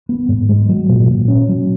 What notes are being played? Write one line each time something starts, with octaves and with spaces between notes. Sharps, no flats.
B3
G#2
G#3
F#3
A#2
A#2
C#4
F#3